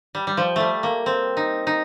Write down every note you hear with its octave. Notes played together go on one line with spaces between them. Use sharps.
G3
G3
F3
G3 A3
A#3
C4
D#4
D#4